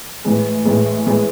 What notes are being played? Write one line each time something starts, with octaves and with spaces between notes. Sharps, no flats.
A2 E3 G#3
A2 E3 G#3
A2 E3 G#3